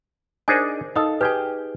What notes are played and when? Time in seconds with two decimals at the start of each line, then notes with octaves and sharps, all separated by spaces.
0.48 D4 D#4 G#4 A#4 C5 G#5
0.96 D#4 A4 D#5 F5 D#6
1.21 G4 G#4 B4 G5 G#5